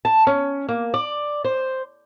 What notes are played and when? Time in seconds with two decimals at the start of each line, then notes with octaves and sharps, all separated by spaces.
0.05 A5
0.27 C#4
0.68 A#3
0.94 D5
1.44 C5